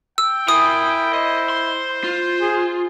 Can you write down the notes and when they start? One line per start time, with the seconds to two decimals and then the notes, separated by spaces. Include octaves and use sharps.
0.18 G5 E6
0.48 E4 A#4 G#5 D#6
1.13 C5 D#5
1.50 C6
2.04 F4
2.41 G#4